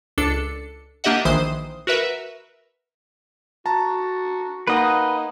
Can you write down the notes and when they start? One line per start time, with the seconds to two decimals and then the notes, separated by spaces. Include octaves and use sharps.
0.18 C#2 D4 A4 C#7
1.04 A#3 D4 G4 D#5 E5 F#5
1.25 A#1 D#3 E3 C5 D#6
1.87 F#4 A#4 B4 E5
3.66 F#4 A5 A#5
4.67 A#3 D#4 B4 D#5 F#5